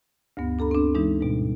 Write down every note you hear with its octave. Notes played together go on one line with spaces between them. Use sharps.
D2 G2 B3
D4 A4 A#5 B5
C4 D4
E3 G#3 D4 D#4
G#2 B2 G3